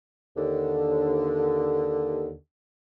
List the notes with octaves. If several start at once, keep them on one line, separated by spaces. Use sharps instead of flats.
D#2 D3